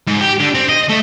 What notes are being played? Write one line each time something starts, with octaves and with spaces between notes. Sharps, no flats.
G#2
G4
D3
C4
D#5
A3